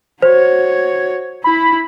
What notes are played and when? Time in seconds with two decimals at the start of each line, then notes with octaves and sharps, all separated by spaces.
0.22 F#4 C5 C#5
1.44 E4 B5